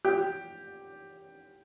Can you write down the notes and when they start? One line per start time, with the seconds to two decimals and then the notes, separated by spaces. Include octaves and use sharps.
0.05 G4